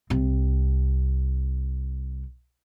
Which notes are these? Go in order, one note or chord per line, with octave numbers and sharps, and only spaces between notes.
C2 C4